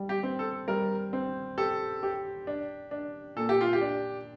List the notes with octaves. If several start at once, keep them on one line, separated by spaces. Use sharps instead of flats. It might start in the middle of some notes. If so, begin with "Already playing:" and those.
Already playing: G3
G4
C4
A4
G3 A#4
C4
G4 A4
G4
D4
D4
A#2 A4
G4
F4
G4
D4